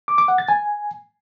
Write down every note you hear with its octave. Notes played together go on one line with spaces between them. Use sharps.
D6
D6
F#5
A6
G#5